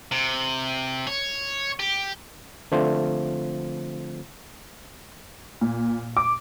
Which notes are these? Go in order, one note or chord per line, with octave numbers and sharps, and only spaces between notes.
C3
C#5
G4
D3 F3 A3 C4 F4 C5
A#2
D6